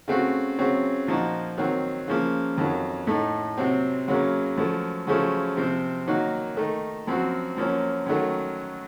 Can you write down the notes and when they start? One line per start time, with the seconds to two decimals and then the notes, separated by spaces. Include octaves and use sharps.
0.08 C#3 A3 C4 F#4
0.58 C#3 F#3 C4
1.07 A#2 F3 A#3 D#4 F#4
1.58 D#3 F#3 C4
2.08 C#3 F3 A#3
2.58 F2 D#3 F#3
3.07 A2 A3 D#4
3.57 C3 F#3 C4
4.08 F#2 C#3 F#3 A#3
4.58 F#2 F3 A3
5.07 F#2 C#3 F3 A3 C#4
5.57 C3 F3 C4
6.07 D#3 F#3 A#3 D#4 F#4
6.57 D#3 A3 D#4
7.07 F#2 F3 C4 F#4
7.57 F#2 F3 A#3 C#4
8.06 F#2 D#3 F#3 A3